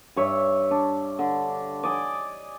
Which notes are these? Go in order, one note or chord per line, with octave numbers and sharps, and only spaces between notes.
G2 C#5 E5
D4
D3
D5 D#5 G#5